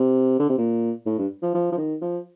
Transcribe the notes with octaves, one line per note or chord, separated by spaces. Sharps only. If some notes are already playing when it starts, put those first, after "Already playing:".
Already playing: C3
D3
C3
A#2
A2
G2
F3
F3
F3
D#3
F3